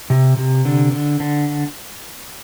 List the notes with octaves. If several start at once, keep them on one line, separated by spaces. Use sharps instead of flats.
C3
C3
D3
D3
D3